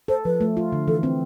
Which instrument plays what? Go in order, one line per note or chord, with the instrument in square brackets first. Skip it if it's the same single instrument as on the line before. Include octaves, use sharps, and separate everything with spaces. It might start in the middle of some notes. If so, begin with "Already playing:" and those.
[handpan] A4 [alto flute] C5
[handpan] F3 [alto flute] B4
[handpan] A3
F4
D3
[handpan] E3 [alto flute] A4
[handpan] C4